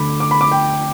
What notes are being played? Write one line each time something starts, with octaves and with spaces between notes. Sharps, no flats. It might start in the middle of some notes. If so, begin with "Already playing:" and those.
Already playing: D2 D3 B5 D6
D6
B5
D6
G5